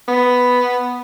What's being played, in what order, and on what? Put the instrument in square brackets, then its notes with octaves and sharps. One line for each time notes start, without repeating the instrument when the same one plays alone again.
[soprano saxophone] B3